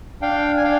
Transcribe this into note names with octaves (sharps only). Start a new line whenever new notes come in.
D4 F5 G5
G#5
D4 F5 G5